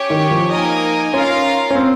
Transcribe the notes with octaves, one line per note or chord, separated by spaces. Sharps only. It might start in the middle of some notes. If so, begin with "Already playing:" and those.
Already playing: C#4 G4 C#5
D#3
F3
A#3 D#4 A#4 D#5 G#5
C#4 F4 A#4 F5
C#4
C4